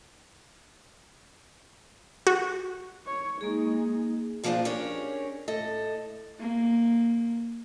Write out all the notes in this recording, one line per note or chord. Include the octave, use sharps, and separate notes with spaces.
F#4
C#5
G#3 A#3 D#4 G#4
A#2 F3 A#3 C4 D4 G#4
C#4 D4 G4 G#4 A#4 C#5
A2 A4 D#5
A#3